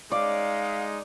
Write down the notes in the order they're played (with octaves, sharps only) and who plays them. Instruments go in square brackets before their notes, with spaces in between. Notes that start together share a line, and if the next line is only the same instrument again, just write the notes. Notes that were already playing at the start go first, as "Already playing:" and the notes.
[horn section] G#3 D#4 [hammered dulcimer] D5 [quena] F5